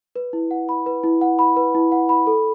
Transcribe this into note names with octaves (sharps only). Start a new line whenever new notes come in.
B4
E4
F#5
B5
B4
E4
F#5
B5
B4
E4
F#5
B5
A4